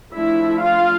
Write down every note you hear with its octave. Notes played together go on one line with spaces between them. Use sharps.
F3 A3 D4 E4 E5
F4 F5